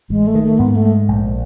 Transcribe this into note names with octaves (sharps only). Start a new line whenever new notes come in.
A1 G#3
A3
D#3
A3
G#2 B3
A3
G#3
A#1